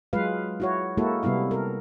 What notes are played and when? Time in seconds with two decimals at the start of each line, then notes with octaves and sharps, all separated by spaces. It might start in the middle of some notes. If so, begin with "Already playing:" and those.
0.13 F#3 G#3 F4 B4 F5
0.60 E4 F#4 C#5
0.97 G#3 A#3 E4 F#4 A4
1.23 C3 G3 B3 E4 F5
1.51 A4 A#4